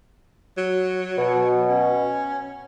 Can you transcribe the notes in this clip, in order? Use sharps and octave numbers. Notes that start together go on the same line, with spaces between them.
F#3
B2
C#4